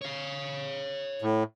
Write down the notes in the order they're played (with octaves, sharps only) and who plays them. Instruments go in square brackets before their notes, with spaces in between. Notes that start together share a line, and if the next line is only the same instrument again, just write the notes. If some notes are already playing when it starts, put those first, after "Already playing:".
[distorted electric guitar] C#5 F5
[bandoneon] A2